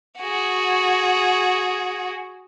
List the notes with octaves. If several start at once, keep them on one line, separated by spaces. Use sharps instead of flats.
F#4 G#4